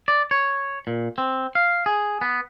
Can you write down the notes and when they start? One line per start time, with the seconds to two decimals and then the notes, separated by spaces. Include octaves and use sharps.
0.08 D5
0.31 C#5
0.87 A#2
1.18 C4
1.55 F5
1.86 G#4
2.21 B3